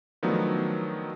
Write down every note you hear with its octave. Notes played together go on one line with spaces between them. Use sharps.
D#3 F3 F#3 A3 B3 D4